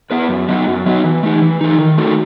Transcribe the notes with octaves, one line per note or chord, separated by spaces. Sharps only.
B3 E4 B4 E5
F#2
F#3 B3 D#4 F#4
F#2
F#3 B3 D#4 F#4
E3
A3 D#4
E3
A3 D#4
D#3
A3 D#4 F#4 A4